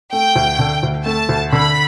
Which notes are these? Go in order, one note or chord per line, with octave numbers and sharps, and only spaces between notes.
A3 G5
D2
D3
D2
A3 A5
D2
D3 B5